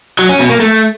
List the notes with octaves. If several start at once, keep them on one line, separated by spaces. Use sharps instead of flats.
F#3
C#4
B2
A#3
A3